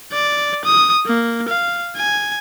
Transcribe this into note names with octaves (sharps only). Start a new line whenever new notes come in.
D5
D#6
A#3
F5
G#5